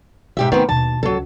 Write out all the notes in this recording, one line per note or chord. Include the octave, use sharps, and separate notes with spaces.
G#2 B2 G4 E5
D#3 A3 B3 C4
D#2 B2 A5
C#2 F#3 A4